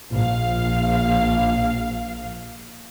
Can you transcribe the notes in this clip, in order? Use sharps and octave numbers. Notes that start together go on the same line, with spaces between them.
A#1 F5